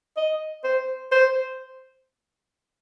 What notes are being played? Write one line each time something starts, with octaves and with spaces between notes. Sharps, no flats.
D#5
C5
C5